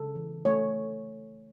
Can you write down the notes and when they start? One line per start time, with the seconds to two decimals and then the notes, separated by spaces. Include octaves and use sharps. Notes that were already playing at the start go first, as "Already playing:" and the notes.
Already playing: C#3 A4
0.15 E3
0.45 A3 C#5